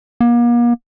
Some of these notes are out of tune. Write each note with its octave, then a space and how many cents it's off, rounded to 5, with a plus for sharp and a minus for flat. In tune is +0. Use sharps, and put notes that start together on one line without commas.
A#3 +40